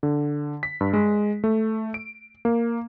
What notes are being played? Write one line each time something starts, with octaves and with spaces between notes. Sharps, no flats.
D3
B6
G2
G#3
A3
D7
A#3